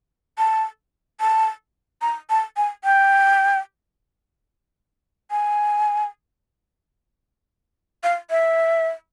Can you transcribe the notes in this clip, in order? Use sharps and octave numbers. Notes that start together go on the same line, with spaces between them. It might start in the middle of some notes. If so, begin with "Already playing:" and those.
A5
A5
A#5
A5
G#5
G5
G#5
F5
E5